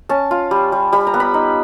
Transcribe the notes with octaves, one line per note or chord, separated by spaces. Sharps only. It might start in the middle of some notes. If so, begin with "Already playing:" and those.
C#4 A5
F4
G3
G3
G3 B5
A#5
B3
B5
D#4